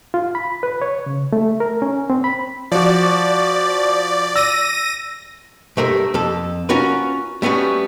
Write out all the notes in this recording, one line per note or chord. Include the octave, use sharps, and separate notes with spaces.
F4
B5
B4
C#5
C#3
A3
A#4
C#4
C4
B5
F3 F#4 D5
E6 A#6 D#7
G2 A3 A#4 C5
F2 A4
C#4 F4 F#4 A#4 B4
G3 A3 B3 C#4 F#4